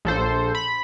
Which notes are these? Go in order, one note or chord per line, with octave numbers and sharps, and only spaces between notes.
A#1 A4 C5
B5